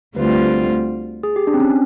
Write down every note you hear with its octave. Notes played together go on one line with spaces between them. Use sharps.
D2 D3 G3 C4 F4 B4
G#4
G4
D4
C4
C#4